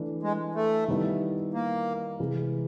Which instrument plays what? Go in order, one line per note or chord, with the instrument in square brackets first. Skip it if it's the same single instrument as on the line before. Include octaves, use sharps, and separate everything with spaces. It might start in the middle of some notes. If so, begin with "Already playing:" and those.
Already playing: [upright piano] E3 A3 D4
[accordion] G#3
A3
[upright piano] D#3 G3 B3 E4
[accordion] A#3
[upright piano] C3 E3 G#3